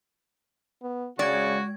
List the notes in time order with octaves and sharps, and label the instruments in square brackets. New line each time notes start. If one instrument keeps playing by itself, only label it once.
[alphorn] B3
[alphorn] C#3 [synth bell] G#3 G#6 [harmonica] F#4 C#6 [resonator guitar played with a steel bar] D5